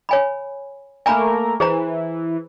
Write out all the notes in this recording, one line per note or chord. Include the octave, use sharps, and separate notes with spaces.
C#5 G#5 B5
A3 A#3 A#4 G#5 A#5 B5
E3 G#4 C5 A#5